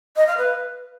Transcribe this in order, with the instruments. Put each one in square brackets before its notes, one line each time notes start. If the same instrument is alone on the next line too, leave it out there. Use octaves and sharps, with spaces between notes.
[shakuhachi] D#5
F5
B4